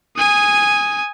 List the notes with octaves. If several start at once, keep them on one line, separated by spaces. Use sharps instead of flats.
G#5 D#6